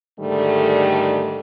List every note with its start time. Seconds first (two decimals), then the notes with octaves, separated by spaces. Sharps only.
0.20 G#2 D3 D#3 G3 A3